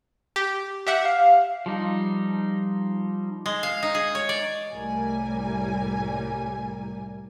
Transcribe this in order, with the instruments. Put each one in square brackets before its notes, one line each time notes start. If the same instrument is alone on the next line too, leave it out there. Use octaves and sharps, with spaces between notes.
[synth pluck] G4
G4 E5 F#5
[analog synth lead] F5
[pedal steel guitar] F3 G3 D#4
[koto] G#3
F5
D#4
G#4
C#5
D5
[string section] C2 A2 G3 A#4 G#5